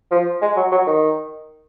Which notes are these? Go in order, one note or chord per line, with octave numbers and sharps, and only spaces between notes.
F3
G#3
F#3
F#3
D#3